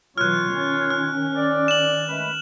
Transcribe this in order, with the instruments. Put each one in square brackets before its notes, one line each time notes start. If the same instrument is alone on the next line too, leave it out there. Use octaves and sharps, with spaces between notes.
[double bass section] B2 E3 F#3 [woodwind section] F4 C#5 [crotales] F6 F#6
[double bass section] D#3 C#4
[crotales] F6
[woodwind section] D5
[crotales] E7 F#7
[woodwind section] G#3 A3 B4